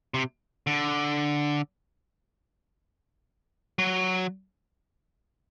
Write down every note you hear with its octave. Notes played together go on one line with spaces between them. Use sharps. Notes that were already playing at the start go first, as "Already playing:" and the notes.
C3
D3
F#3